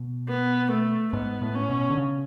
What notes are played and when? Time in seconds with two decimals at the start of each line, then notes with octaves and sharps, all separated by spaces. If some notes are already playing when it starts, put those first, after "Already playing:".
Already playing: B2
0.28 B3
0.71 A3
1.13 G#2 B3
1.42 A2
1.55 C#4
1.70 B2
1.90 D3
1.98 C#3